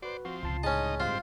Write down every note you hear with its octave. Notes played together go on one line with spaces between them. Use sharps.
F#4 B4 C5 D5
F3 C4 F#4
C#2 C3 F4 A5 C7
A2 G#3 C#4 D#4 D#5 A5
G2 C4 F4 C5